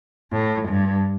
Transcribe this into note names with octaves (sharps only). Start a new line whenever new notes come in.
A2
G2